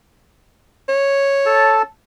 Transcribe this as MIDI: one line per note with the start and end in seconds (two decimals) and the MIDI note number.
0.89 1.82 73
1.46 1.82 69
1.46 1.82 81